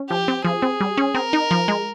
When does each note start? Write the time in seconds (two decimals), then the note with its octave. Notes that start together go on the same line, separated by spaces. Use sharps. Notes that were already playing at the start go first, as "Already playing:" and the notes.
Already playing: C#4
0.10 F3 G4
0.28 C4
0.45 F3 G#4
0.62 C4
0.80 G3
0.97 C#4
1.15 C4 A#4
1.33 D#4
1.51 F3
1.68 G#3